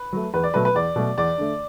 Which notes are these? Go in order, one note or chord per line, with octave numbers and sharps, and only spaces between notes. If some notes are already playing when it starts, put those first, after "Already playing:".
Already playing: B4
F#3 A3
E2 B4
D5
B2 F#3 A3 B4
B4
E2 D5
B2 F#3 A3
E2 D5
D3 A3